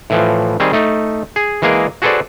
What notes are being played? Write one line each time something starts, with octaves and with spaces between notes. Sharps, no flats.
A2 E3 F3
D#3 G3 C4 G#4
A3 D#4
G#4
E3 G#3 A#3 G#4 A#4
F#4 G#4 A4 B4 C5 D5